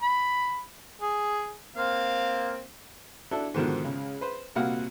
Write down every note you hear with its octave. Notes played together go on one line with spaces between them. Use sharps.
B5
G#4
A#3 C4 F5
D4 E4 F#4 A4
G#2 B2 D3 D#3 F3 F#4
C#2 C#3
B4 C5
C2 A#2 A#3 F#4 F5 F#5